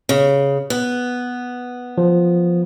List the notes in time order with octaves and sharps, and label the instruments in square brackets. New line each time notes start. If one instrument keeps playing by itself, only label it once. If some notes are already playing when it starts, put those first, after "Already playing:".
[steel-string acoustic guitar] C#3
B3
[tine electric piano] F3